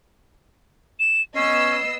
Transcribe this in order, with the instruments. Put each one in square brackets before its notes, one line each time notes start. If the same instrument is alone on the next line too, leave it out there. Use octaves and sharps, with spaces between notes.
[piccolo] E7
[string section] B3 D#5 E6 [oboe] C#4 [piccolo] C7